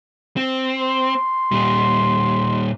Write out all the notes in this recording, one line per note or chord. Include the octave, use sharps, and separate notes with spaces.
C4
C6
A#2 G3